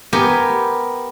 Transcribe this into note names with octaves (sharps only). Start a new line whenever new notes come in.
B3 G4 A#4 G#5